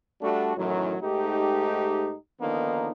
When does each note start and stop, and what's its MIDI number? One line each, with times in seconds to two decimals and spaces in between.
0.22 0.55 55
0.22 0.55 57
0.22 0.55 62
0.22 0.55 66
0.57 0.97 42
0.57 0.97 45
0.57 0.97 51
0.57 0.97 52
0.57 0.97 54
1.02 2.14 44
1.02 2.14 57
1.02 2.14 63
1.02 2.14 67
2.41 2.92 50
2.41 2.92 51
2.41 2.92 53
2.41 2.92 58
2.41 2.92 59
2.41 2.92 63